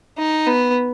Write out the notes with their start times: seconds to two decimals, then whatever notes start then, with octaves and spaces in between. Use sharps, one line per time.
0.18 D#4
0.47 B3